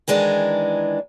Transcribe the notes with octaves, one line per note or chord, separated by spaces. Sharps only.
D#3 E3 G#3 D4 A#4